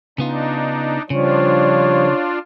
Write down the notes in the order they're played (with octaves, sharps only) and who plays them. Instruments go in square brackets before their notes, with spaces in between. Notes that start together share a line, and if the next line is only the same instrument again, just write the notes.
[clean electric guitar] C#3 B3 F4 [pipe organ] D4 D#4
[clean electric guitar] C#3 [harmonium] F3 G3 [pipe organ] D4 F4 [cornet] C#5